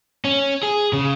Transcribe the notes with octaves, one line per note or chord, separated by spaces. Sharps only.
C#4
G#4
C#3